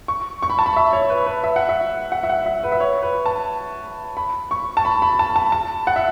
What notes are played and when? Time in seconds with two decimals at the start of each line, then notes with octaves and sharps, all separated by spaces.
0.08 C#6
0.43 C#6
0.50 B5
0.59 A5
0.66 B5
0.76 E5
0.93 C#5
1.10 B4
1.26 B4
1.44 E5
1.56 F#5
1.69 E5
2.12 F#5
2.23 E5
2.30 F#5
2.46 E5
2.63 B4
2.72 E5
2.80 C#5
3.02 B4
3.26 A5
4.17 B5
4.51 C#6
4.77 A5
4.85 B5
5.02 B5
5.19 A5
5.36 A5
5.52 A5
5.87 F#5
5.96 E5